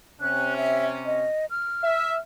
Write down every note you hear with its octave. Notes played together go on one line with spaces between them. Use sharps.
C3 C#4 F#6
E5
D#5
F6
E5